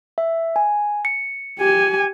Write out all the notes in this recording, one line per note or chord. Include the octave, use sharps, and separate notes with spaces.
E5
G#5
C#7
G4 G#5